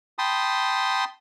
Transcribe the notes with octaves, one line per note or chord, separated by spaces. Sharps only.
G5 A5 B5 C6 D#6